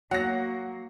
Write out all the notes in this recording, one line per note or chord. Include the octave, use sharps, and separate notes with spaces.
F#3 A#3 F#5 A#6